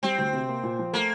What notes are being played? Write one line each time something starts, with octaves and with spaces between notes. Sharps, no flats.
G3 C4
D2
C3
A#3
A#2
F3
A3 A#3